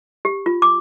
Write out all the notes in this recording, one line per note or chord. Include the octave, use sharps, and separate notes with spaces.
G4
F4
D6